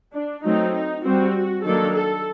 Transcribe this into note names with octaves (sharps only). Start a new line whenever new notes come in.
D4
F#3 A3 C4 D#4
D#4
G3 C4 F#4
D#3 F#3 A#3 D4 A4
A4